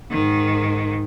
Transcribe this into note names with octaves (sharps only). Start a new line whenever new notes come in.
G#2 D#3